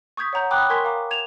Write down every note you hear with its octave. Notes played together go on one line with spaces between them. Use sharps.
C#6 D#6 G6 G#6 B6
C#5 F#5 A#5 G6
G5 A#5 B5 D6 D#6 F#6
A#4 G#5 C6 C#6 G#6 B6
F5 A#5 D6
G#6 E7 F7